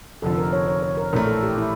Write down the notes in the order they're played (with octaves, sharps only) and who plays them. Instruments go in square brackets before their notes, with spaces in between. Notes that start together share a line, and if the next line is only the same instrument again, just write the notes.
[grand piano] F1 F2 D3 F3 [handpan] A4
[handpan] A#4
C#5
C#5
C#5
A#4
[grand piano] A#1 A2 E3 A3 [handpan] A#4
[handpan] A4
G4
E4